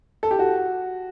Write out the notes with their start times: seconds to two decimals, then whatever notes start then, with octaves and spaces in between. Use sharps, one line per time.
0.23 A4
0.31 G4
0.39 F#4